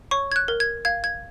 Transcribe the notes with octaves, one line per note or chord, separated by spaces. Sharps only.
C#5 C#6
G#6
F#6
A#4
G#6
F5 G#6
G#6